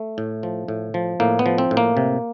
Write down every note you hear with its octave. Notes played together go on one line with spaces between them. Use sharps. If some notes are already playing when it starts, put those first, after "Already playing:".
Already playing: A3
A2
F3
A2
F3
A2 A#3
B3
F3
C4
A2
A#3
C3